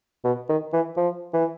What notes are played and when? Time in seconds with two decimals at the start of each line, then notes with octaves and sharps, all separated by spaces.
0.24 B2
0.49 D#3
0.73 E3
0.97 F3
1.33 E3